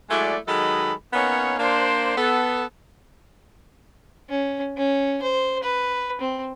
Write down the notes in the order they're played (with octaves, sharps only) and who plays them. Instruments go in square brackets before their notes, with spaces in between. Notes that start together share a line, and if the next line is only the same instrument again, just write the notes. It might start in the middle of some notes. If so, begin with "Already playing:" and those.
[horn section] F#3 G#3 A3 E4 D5
D#3 F#3 G#3 A4 D#5 B5
A#3 B3 C#4 D#4 A#4 C#5
A#3 D4 C5
B3 A4
[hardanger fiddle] C#4
C#4
C5
B4
C4